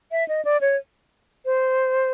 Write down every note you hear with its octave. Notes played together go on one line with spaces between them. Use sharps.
E5
D#5
D5
C#5
C5